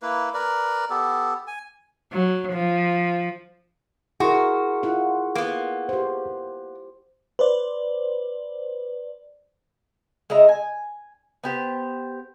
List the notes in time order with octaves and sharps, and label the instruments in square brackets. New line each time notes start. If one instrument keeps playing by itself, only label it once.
[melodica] A#3 E4 B4
A#4 B4 D5
B3 G4 A4
G#5
[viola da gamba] F#3
F3
[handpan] E4 A#4 [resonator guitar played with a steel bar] F#4 [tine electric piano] G#4 C6 C#6
[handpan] E4 F4 F#5
[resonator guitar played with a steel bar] A#3 B3
[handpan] G4 C5
[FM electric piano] B4 C5 D5
[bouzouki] G#3 D#5 E5 A#5
G#5
B3 G4 C5